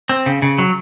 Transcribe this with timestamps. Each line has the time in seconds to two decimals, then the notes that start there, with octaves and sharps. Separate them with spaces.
0.09 C4
0.26 C#3
0.42 C#3
0.58 F#3